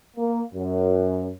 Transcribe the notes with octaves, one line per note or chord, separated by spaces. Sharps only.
A#3
F#2